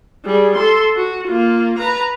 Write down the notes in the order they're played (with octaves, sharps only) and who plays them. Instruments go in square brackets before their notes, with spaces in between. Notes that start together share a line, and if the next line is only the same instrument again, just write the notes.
[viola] G3 G#4
A4 C6
F#4
A#3 F4
B4 A#5